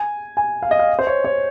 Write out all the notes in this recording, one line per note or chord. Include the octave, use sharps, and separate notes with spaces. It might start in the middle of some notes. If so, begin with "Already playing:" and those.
Already playing: G#5
G#5
F5
D#5
F5
C5
C#5
C#5